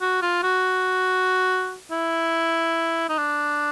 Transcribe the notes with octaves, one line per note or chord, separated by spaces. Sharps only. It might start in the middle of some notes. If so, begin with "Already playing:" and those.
F#4
F4
F#4
E4
D#4
D4